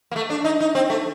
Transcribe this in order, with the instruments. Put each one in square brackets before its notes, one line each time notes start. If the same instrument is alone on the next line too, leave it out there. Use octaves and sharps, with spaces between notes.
[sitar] A#3
A3
D4
D#4
D#4
C4
A3